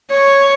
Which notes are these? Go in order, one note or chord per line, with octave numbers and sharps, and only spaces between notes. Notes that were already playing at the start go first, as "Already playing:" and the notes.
C#5